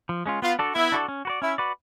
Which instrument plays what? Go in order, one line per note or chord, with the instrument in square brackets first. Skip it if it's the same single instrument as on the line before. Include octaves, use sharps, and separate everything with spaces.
[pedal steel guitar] F3
G#3 C#4 F4
[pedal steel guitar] B3 [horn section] F4
[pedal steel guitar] D4 F#4 A4 D5
[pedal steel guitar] B3 [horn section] E4
[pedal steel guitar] D4 F#4 A4 D5
C#4
F#4 B4 D5
[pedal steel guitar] C#4 [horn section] E4
[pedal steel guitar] F#4 B4 D5